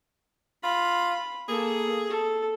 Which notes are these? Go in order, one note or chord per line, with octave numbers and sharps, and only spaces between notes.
F4 B5
A#3 G#4 A4
A4